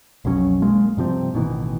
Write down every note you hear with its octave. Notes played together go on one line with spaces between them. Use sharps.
B1 F2 F#3 C#4
B1 G#3 A#3
G2 C3 F3 C4
A1 B2 D#3 E3